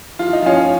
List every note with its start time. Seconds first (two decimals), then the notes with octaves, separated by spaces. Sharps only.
0.19 F3 F4
0.33 D#4
0.42 F3 C#4 F4